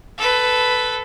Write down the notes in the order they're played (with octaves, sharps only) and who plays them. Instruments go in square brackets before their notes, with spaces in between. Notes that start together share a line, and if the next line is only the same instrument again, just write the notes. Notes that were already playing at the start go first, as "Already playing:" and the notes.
[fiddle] A4 B4